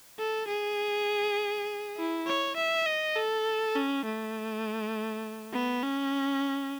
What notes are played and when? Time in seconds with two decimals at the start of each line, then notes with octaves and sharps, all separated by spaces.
0.19 A4
0.48 G#4
1.97 E4
2.27 C#5
2.57 E5
2.86 D#5
3.16 A4
3.76 C#4
4.05 A3
5.53 B3
5.83 C#4